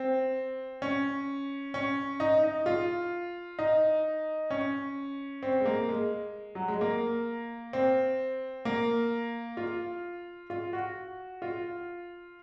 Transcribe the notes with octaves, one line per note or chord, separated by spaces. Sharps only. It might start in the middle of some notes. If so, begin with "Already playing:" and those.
Already playing: C4
C#4
C#4
D#4
D#4
F4
D#4
C#4
C4
G#3
A#3
G#3
F#3
G#3
A#3
C4
A#3
F4
F4
F#4
F4